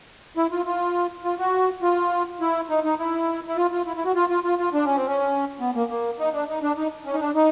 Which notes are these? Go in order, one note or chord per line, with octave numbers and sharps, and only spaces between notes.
E4
F4
F4
F4
F#4
F4
E4
D#4
D#4
E4
E4
F4
F4
E4
E4
F#4
F4
F4
F4
F4
D4
C#4
C4
C#4
B3
A#3
A#3
D#4
D4
D#4
D4
D#4
C#4
D#4
D4
D#4